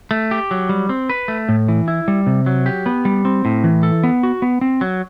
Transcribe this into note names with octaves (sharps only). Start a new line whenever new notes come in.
A3
G4
F#3
G3
C4
B4
A3
A2
E3
E4
G3
C3
F#3
G4
B3
G3
C4
A2
E3
A4
B3
F#4
B3
C4
F#3